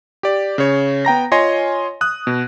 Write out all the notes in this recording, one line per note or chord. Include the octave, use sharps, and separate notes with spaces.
G4 D5
C#3 C#5
B3 G5 A#5 A#6
F4 C#5 D#5 G#5 C6 A#6
D#6 F#6
B2